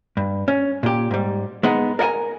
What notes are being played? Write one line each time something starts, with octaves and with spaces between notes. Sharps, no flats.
G2
C#4
A#2 G4
G#2 G3
G#3 B3 D#4
A#4 D5 F#5 G#5 A#5